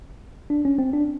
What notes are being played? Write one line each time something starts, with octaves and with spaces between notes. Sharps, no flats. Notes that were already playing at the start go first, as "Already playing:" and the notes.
D4
C#4
C4
D4